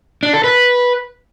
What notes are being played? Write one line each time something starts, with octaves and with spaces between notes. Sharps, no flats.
D4
A4
B4